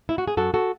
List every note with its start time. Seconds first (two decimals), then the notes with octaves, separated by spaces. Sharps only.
0.09 E4
0.18 F#4
0.28 G#4
0.37 F#2 F#4 A4
0.54 F#4 A4